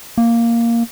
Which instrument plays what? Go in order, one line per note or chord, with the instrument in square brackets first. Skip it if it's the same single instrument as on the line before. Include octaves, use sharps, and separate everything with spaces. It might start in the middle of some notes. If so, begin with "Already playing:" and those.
[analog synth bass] A#3